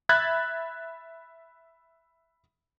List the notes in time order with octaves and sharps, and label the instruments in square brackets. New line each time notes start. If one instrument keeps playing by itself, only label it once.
[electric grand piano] E5 B5 F#6 G#6 A6